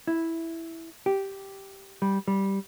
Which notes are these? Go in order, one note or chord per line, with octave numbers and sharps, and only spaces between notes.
E4
G4
G3
G3